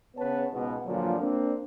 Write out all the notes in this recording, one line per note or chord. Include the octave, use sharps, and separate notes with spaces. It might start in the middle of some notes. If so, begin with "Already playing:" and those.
C#3 B3 B4 C#5 A5
C#2 G#2 B2
G2 A#2 D3 F3 F#3
A#3 C4 D4